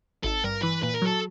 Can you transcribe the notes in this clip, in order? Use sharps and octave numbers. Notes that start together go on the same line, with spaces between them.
G#1 A4
G2 A#4
E3 B4
A#2 B4
A#4
F#3 A4